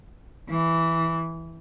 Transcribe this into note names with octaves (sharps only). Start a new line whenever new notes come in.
E3